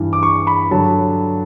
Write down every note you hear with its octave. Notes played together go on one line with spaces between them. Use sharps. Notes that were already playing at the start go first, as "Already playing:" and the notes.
Already playing: G2 E3
D6
C#6
B5
G2 D3 F#3 A5